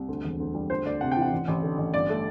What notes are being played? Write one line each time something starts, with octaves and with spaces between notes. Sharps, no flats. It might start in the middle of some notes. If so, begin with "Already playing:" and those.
Already playing: C2
D2
E1
D2
G3
D2 C5
D2 D5
C3 F#5
G5
E3
F#5
A1
A1
D3
A1
G1 D5
A3